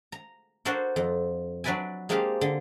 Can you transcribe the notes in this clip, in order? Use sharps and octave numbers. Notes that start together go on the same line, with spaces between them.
A#5
D4 F#4 A4 A#4 C5
F2
F#3 D4 B4 D5 E5 G#5
G#3 A#3 C4 D4 G4 F5
D3